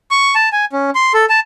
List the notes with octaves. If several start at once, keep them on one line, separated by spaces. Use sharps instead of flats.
C#6
A5
G#5
C#4
C6
A4
A5